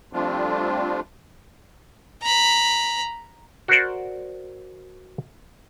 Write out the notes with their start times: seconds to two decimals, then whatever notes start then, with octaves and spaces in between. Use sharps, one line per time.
0.13 F3 G3 A3 C4 D4 F4
2.22 A#5 B5
3.68 F#4 A#4 C5 D5